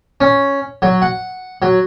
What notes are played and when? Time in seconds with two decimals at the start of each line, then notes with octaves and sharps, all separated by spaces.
0.21 C#4
0.82 F#3
1.02 F#5
1.62 F#3